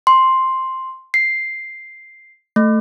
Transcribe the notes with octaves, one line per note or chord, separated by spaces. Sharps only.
C6
C7
A3